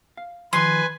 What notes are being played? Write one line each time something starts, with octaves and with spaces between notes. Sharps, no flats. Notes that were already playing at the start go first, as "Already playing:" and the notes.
F5
D#3 F3 B4 G#5 C6